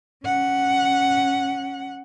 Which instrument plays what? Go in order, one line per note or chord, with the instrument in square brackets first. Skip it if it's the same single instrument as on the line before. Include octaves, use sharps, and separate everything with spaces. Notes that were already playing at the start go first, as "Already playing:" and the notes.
[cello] C#4 F#5